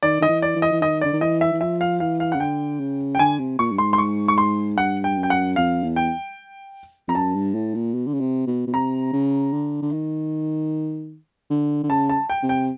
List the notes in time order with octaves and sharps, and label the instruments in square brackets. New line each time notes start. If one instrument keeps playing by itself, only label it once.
[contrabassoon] D#3 [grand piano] D5
[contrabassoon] D#3 [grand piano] D#5
[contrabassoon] E3
[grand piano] D5
[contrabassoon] E3
[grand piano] D#5
[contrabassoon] E3
[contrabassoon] D#3 [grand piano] D#5
[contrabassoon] D3 [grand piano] D5
[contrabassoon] D#3
[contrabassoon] E3 [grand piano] D#5
[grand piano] E5
[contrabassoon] E3
[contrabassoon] F3 [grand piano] E5
[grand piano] F5
[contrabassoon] E3 [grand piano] F5
[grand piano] F5
[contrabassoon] C#3 [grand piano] F#5
[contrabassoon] D3 [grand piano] G5
[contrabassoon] C#3
[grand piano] G5
[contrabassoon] D3 [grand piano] G#5
[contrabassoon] C3
[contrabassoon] A#2 [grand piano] C#6
[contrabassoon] G2
[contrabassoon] G#2 [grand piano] C6
[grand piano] C6
C#6
C#6
C6
[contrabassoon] G2 [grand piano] F#5
[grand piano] G5
[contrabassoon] F#2
[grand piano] G5
F#5
[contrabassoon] F2 [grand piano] F5
[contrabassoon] E2
[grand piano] G5
[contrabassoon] F2 [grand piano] A#5
[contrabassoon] F#2 [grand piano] A5
[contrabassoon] G2
A2
A#2
B2
D3
C#3
C3
B2
B2
[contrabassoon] C3 [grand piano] A#5
[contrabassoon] C#3
D3
D3
D#3
D3
D3
[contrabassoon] C#3 [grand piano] A5
[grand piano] A5
G5
[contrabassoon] C3
[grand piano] G5